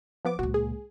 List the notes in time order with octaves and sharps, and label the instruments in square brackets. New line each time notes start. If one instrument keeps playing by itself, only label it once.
[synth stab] F3 B3 D6
[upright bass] C#2 A#2 [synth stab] F#4
[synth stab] G#4